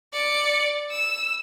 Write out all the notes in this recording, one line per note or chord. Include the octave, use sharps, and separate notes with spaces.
D5 C#7
E6